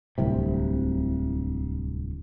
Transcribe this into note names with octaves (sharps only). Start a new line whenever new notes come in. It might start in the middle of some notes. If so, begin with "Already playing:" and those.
D1 C2 C3